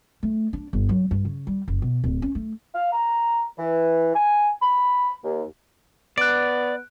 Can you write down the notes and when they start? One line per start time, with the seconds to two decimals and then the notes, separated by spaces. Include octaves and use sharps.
0.23 A3
0.53 D4
0.73 G1
0.89 F#3
1.11 G2
1.25 C#3
1.47 G3
1.68 F#1
1.82 B2
2.04 D1
2.22 C#4
2.35 A3
2.75 F5
2.92 A#5
3.58 E3
4.15 G#5
4.61 B5
5.24 D#2
6.18 B3 D5 F#6 D7